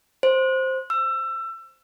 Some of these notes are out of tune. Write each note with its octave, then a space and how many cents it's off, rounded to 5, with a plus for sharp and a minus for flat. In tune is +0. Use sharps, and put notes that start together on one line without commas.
C5 +5
E6 +25